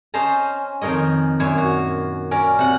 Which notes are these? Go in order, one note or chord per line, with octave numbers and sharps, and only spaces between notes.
C#4 C5 D#5 A5 A#5
F2 D#3 A#4 C#5 D#5
F#2 A#2 C#5 G#5
F#4
C#4 A#4 D5
C3 F#5